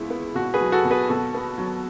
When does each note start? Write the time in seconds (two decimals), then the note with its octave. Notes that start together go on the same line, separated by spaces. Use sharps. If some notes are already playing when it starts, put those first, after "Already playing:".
Already playing: C#2 B3 E4
0.10 B3
0.35 B2 F#4
0.54 G#4 B4
0.61 F#3
0.72 F#4 A4
0.85 B2
0.91 G#4 B4
1.09 B2 F#4 A4
1.34 B3
1.58 F#3